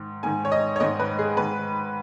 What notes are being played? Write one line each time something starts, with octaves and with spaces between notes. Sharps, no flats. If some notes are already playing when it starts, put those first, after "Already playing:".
Already playing: G#2 D#3
G#2 D#3 G#5
C#5
D#5
C#5
G#2 D#3 D#5
B4
G#4
G#2 D#3 B4